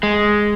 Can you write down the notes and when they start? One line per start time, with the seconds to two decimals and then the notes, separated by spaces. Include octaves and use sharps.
0.03 G#3